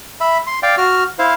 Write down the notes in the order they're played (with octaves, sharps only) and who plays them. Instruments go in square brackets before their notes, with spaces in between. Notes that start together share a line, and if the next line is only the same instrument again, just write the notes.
[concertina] E5 B5
C6
D5 F5 G5
F#4 F6
E4 C5 F5